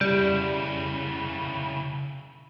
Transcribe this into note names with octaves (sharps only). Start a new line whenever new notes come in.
C#3 G3 E4